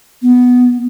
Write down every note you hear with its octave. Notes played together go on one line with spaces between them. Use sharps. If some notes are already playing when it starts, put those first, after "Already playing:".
B3